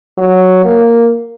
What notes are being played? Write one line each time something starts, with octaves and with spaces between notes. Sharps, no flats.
F#3
A#3